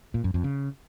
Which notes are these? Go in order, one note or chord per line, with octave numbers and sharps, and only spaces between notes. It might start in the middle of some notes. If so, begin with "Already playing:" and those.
A#2
F#2
F2
C#3